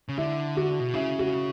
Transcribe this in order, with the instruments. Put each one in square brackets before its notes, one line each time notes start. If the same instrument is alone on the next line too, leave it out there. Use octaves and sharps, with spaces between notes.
[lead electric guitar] C#3
[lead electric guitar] D3 [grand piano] E4
[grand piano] F#4
[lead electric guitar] B2
[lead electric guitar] C#3 [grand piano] E4
[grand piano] F#4